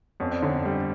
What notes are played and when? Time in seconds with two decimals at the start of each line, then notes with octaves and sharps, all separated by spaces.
0.20 F2 B3 C#4
0.31 C4 D4
0.42 D3 C#4 D#4
0.54 C4 D4
0.65 G3